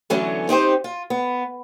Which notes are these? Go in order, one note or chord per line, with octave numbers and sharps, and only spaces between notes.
D3 E3 F#3 A3 B3 C#4
C4 D#4 G4 C5
F4
B3